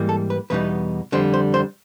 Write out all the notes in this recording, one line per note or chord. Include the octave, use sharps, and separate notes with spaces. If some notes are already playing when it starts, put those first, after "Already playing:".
Already playing: G#2 E3 G3 A#3
A4
B4
E2 B2 G3 B3 D#4 B4
F2 D3 G3 C5
C5
C5